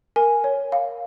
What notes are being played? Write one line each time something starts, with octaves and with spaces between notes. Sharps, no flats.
A#4 G#5
C#5
F5